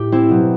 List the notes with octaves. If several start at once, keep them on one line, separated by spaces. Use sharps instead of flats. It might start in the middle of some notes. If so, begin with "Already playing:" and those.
Already playing: A2 G4
C4 E4
B2 F#3